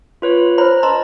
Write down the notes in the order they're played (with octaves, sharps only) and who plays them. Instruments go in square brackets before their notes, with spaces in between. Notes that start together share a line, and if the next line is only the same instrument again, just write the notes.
[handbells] F4 B4 C#5
[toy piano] C5 C#5 B5 [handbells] A#5 F6
[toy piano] B4 A#5 C6 [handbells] D#5 A5